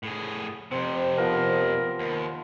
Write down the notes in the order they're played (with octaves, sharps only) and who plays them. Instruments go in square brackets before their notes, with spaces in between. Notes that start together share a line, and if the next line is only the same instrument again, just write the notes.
[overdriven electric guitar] A2 G#4
[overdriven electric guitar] F2 C3 [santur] C4
[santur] F3 B3 A5 [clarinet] A#4
[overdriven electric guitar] D#2